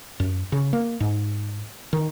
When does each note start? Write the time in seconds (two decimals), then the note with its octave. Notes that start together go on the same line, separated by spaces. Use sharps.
0.20 F#2
0.52 C#3
0.73 A#3
1.00 G#2
1.93 D#3